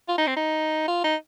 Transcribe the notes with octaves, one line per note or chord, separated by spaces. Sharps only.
F4
D#4
C4
D#4
F4
D#4